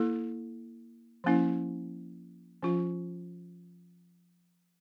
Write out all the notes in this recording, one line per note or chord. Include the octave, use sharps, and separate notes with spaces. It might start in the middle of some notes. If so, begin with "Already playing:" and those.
Already playing: A#3 E4 A4
F3 A#3 C#4 E4
F3 C#4 F4